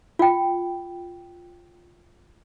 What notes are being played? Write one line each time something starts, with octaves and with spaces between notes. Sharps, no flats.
F4 G5